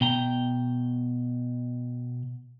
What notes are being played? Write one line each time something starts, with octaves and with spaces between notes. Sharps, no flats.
B2 G5 A#5